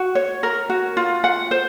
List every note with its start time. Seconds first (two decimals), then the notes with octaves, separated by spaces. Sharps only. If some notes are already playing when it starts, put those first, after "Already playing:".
Already playing: F#4
0.15 C#5
0.43 A#4
0.70 F#4
0.97 F4
1.24 F#5
1.51 C5